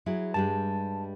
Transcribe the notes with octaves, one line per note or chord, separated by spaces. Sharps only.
F#3 E4 G#4
G2 G3 G#3 A5